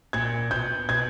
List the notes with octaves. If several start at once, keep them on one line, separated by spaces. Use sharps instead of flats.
A#2 G#6
B2 G6
B2 G#6